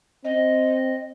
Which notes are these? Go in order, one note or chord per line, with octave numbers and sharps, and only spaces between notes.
C4 D#5